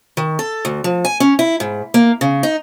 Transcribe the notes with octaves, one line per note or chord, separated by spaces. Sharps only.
D#3
A4
D2
F3
G#5
C#4
E4
G#2
A#3
C#3
D#4